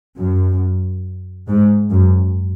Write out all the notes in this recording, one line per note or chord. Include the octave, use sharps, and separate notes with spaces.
F#2
G#2
F#2